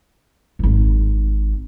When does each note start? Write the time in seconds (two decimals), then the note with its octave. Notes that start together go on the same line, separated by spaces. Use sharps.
0.59 D1 G#1